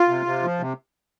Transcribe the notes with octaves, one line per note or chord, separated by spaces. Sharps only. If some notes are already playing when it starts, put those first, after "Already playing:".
Already playing: F4
C3
C3
F3
C3